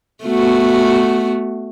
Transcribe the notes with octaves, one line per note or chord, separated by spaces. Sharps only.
A3 B3 F#4